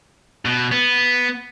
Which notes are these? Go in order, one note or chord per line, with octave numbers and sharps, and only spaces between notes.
B2
B3